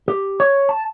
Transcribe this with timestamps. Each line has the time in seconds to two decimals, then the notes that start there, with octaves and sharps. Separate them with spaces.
0.08 G4
0.40 C#5
0.69 A5